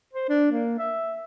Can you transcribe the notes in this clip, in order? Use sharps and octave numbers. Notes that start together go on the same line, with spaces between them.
C5
D4
A#3
E5